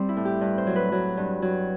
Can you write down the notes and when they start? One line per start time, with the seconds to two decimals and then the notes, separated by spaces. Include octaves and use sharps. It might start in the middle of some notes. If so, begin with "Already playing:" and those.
Already playing: G3 C4
0.09 E4
0.17 A2
0.25 G4
0.41 G2 B4
0.58 C5
0.67 F#3
0.76 B4
0.92 F#3
1.17 G2
1.42 F#3